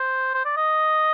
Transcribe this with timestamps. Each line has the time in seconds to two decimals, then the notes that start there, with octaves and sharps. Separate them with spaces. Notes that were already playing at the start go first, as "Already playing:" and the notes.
Already playing: C5
0.34 C5
0.45 D5
0.57 D#5